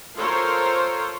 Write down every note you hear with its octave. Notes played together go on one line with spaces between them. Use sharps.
F4 A4 A#4 C5 C#5 C6